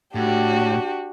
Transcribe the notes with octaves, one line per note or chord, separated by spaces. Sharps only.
A2 D4 F#4 G4